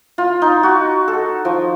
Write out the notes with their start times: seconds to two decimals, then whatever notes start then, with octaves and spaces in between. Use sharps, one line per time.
0.18 F4
0.42 D#4
0.63 F#4
1.08 A4
1.45 F3